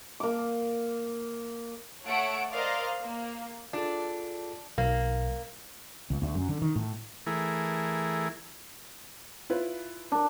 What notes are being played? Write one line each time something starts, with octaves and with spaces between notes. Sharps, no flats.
A#3 D6
A3 A4 C#5 F#5 D7
A#4 C5 D5 D#5 F5
A#3
D4 F4 G#4 A4
B1 A#3
C#2
D2
F#2
D3
D#3
A2
E3 A3 E4 G#4 A#4
E4 F4 B4
D4 A#4